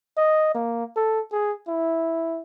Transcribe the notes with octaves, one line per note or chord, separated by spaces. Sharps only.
D#5
A#3
A4
G#4
E4